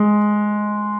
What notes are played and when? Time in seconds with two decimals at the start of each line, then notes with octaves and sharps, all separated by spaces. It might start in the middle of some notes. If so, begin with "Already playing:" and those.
Already playing: G#3